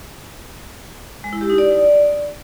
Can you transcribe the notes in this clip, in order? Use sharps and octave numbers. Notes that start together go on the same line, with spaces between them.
G#3
E4
G4
D#4
D5